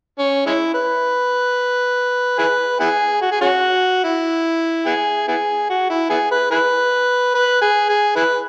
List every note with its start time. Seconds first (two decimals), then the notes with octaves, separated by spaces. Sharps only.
0.19 C#4
0.47 G#3 C#4 E4
0.74 B4
2.38 E4 G#4 B4
2.80 B3 E4 G#4
3.22 F#4
3.32 G#4
3.41 C#4 F#4
4.04 E4
4.86 B3 E4 G#4
5.28 B3 E4 G#4
5.70 F#4
5.90 E4
6.10 B3 E4 G#4
6.31 B4
6.51 E4 G#4 B4
7.35 B4
7.62 G#4
7.89 G#4
8.16 E4 G#4 B4